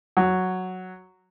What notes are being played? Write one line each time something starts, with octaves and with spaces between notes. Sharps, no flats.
F#3